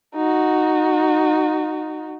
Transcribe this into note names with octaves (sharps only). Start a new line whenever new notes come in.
D#4 F#4